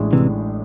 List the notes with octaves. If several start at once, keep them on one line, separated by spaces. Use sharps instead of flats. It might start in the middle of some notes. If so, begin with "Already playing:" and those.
Already playing: A1 A2 G#3 D4 G#4
C3 E3